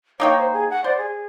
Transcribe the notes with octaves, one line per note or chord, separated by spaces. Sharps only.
A#3 D#4 C#5 G5
C5
G#4
F#5
C5 D5
G#4